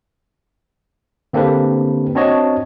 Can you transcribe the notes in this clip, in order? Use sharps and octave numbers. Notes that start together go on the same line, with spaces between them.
D3 A#3 C4 D4 G4 B4
C4 D4 F#4 C#5 D#5 A5